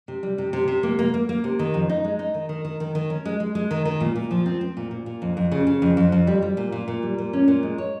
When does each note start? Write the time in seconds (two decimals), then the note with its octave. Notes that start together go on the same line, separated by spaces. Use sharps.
0.08 C3
0.23 G3
0.38 C3
0.53 C3
0.68 C3
0.83 A#3
0.99 A#3
1.14 A#3
1.29 A#3
1.44 C3
1.59 D#3
1.74 F2
1.89 D#4
2.05 G#3
2.19 D#4
2.34 D#3
2.49 D#3
2.65 D#3
2.80 D#3
2.95 D#3
3.10 C#4
3.25 G#3
3.40 G#3
3.55 G#3
3.71 D#3
3.85 D#3
4.00 A#2
4.16 A#2
4.31 F3
4.46 C4
4.61 C4
4.77 A#2
4.91 A#2
5.06 A#2
5.22 F2
5.37 F2
5.52 C#3
5.67 C#3
5.82 F2
5.97 F2
6.12 F2
6.27 G3
6.42 G3
6.57 A#2
6.72 A#2
6.88 A#2
7.03 G3
7.18 A#2
7.33 C#4
7.48 A#2
7.63 G#3
7.78 C#5